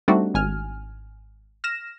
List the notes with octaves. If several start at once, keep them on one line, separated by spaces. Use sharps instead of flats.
G3 A3 C4 D4 D#4 F#4
G#1 G#5 F6
F6 A#6 E7